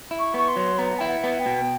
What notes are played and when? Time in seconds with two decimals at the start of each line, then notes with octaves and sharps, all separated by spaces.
0.11 E4
0.19 C#6
0.34 B3 C#6
0.48 C6
0.56 F#3
0.78 B3 A#5
0.99 E4 G5
1.08 F#5
1.24 B3
1.39 G5
1.46 B2